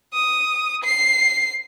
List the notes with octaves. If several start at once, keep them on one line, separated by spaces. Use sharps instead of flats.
D#6
C7